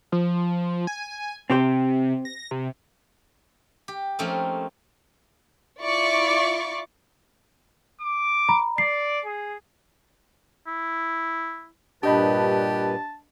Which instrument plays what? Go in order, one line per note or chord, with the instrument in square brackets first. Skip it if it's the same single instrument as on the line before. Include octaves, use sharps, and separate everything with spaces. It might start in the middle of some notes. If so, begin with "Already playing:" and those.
[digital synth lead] F3
G#5
[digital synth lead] C3 [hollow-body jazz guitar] C4 G4 C5
[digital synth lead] A#6
C3
[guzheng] G4
F3 A3 A#3 C4 C#4 D#4
[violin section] E4 F4 D5 C#6 D6
[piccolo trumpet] D6
[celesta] A#5 B5
[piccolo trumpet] D5 [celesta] C7
[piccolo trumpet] G#4
[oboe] E4
[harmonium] G2 A#2 B4 [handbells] D4 D#5 B5 [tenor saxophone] G4 [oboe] A5